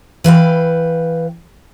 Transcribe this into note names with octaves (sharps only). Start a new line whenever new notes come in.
E3 B4 F5 G5